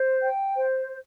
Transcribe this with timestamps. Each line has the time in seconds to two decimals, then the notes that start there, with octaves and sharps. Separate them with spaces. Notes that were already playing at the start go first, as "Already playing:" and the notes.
Already playing: C5
0.22 G5
0.57 C5